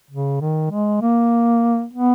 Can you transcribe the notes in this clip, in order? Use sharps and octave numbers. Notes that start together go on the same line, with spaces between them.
C#3
D#3
G#3
A#3
B3